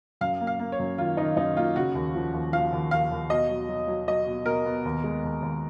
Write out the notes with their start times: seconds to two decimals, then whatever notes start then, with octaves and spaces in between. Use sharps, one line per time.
0.21 F#2 F5
0.41 A#3
0.47 F5
0.59 A#3
0.72 C#5
0.79 F#2
0.98 D#3 F4
1.17 D#3 D#4
1.36 F#2 D#4
1.57 A#3 F4
1.76 C#3 F#4
1.95 D#2
2.15 F3
2.33 D#2
2.52 F3 F5
2.73 D#2
2.91 D#2 F5
3.11 D#2
3.30 B2 D#5
3.49 F#3
3.69 F#3
3.87 F#3
4.08 F#3 D#5
4.27 B2
4.45 B2 A#4
4.65 B3
4.85 D#2
5.04 G#3
5.23 D#2
5.42 D#2